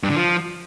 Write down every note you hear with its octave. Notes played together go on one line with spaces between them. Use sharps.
G2
D3
F3